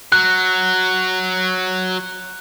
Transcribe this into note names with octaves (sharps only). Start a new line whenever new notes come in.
F#3 F#6